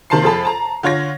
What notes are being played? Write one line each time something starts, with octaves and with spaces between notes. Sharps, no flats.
C3 D#3 A#3 A5 C6 C7
F2 G#4 A4 A5 B5
A5 A#5
D3 F4 C#5 G#6 A#6